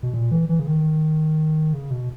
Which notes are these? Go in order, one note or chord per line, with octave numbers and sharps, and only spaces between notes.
B2
A#2
E3
E3
C#3
D#3
C#3
B2